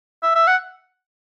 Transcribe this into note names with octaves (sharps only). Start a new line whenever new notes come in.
E5
E5
F#5